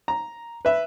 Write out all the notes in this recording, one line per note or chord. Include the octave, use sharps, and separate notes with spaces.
A#5
B4 E5